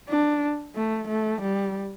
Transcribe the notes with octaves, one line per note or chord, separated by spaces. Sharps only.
D4
A3
A3
G3